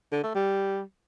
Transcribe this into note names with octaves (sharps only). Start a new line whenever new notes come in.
D3
A3
G3